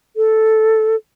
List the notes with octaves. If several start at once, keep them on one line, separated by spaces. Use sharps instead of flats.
A4